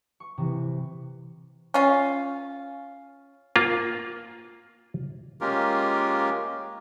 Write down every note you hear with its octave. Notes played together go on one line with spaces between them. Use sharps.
C#6
C3 E3
C#4 F4
A#3 F4
G#3 A#3 C#4 F4 G4 A#4